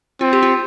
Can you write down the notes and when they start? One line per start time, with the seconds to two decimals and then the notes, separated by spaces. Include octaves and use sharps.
0.21 C4 F4
0.33 G4
0.43 F4